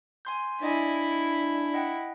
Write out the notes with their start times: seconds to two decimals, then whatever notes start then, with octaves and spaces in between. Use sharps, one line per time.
0.25 G#5 C6 G6
0.61 D4 E4 D5 D#5 G#5
1.74 D#5 F#5 G5